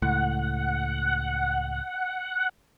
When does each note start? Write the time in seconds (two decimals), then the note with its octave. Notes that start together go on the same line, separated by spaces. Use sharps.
0.02 C#2 A2 F#5